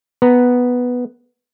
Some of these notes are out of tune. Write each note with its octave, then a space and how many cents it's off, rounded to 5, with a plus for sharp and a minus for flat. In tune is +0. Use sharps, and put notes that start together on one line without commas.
B3 +0 A#5 +0